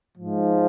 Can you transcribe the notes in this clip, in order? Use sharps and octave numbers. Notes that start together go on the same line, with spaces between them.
G#2 F3